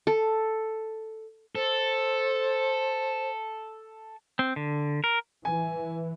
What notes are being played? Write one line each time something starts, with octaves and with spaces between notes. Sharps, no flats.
A4
A4 C5
C4
D3
A#4
E3 G#5